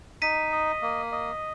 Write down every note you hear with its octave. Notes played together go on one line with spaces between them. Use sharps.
D#4 B6 D#7
D#5
A#3
D#5